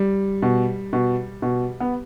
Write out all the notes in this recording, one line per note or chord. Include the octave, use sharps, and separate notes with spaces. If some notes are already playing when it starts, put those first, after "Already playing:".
Already playing: G3
B2
B2
B2
B3